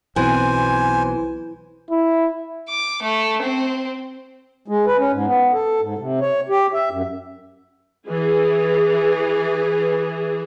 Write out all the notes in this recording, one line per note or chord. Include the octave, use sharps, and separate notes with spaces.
B1 B2 E3 C4 C5 G#5
E4
D6
A3
C4
G#3
B4
C#4
G#2
B3
A4
G#2
C3
C#5
G4
E5
F#2
E3 G#4